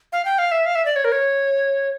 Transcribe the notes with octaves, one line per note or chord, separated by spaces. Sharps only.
F5
G5
F5
E5
F5
E5
D5
C#5
A#4
C#5